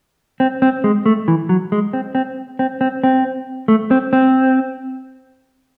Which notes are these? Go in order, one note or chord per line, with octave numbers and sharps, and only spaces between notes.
C4
C4
G#3
A3
E3
F#3
G#3
C4
C4
C4
C4
C4
A3
C4
C4